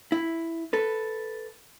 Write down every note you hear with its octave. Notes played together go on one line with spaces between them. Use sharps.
E4
A4 B4